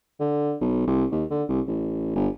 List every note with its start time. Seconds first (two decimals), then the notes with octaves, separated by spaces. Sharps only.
0.20 D3
0.61 B1
0.87 C2
1.12 D#2
1.31 D3
1.49 C2
1.68 A1
2.15 G1